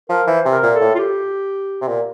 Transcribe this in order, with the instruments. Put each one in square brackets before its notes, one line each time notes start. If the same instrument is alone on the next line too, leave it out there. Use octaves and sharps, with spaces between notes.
[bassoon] F3 [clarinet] A#4
[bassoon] E3 [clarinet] C5
[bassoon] C3
[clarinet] A#4
[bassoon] A#2
[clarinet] A4
[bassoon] A2
[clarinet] F4
G4
[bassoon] C3
A#2